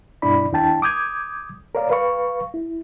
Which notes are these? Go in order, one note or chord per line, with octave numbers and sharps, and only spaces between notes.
G2 B2 D4 E4 D5 B5
D#2 D4 E4 G5 A5
D6 D#6 G6 G#6
A#4 C#5 D5 F5
B4 F5 C#6
E4